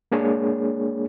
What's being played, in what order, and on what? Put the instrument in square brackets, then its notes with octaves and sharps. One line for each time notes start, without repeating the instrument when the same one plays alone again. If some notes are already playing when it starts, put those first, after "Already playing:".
[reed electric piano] G#3 A#3 D4 G#4 C#5